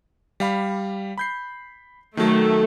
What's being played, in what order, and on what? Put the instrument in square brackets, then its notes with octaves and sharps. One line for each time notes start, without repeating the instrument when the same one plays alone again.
[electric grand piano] G3 F5 B5
B5 G6 C7
[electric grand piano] D#3 F#3 [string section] A3